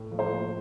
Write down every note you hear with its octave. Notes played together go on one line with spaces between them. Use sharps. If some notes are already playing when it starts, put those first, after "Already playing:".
Already playing: A2
F3
C5
A#3